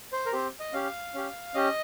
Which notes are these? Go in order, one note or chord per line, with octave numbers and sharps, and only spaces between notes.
C5
A#4
C4 G4 C5
D#5
C#4 G4 F5
C#4 G4
C#4 G4 D#5